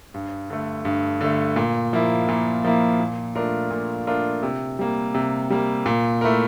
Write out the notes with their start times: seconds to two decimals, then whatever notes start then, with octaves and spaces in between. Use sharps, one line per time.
0.14 G2
0.50 D3 A3
0.85 G2
1.21 D3 A3
1.56 A#2
1.93 F3 A#3 E4
2.29 A#2
2.65 F3 A#3 E4
3.00 A#2
3.35 A3 D4 F4 A#4
3.71 A#2
4.07 A3 D4 F4 A#4
4.43 C3
4.79 G3 A#3
5.14 C3
5.50 G3 A#3
5.86 A#2
6.21 A3 E4 A#4